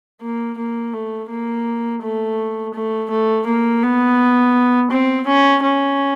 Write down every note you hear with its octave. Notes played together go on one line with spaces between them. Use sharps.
A#3
A#3
A3
A#3
A3
A3
A3
A#3
B3
C4
C#4
C#4